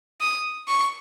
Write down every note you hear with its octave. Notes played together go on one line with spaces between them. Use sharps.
D#6
C#6